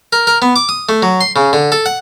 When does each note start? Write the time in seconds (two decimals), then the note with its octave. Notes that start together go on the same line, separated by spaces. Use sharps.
0.13 A#4
0.27 A#4
0.42 B3
0.56 D6
0.69 D#6
0.89 A3
1.03 F#3
1.21 C6
1.36 C#3
1.53 D3
1.72 A4
1.86 F#5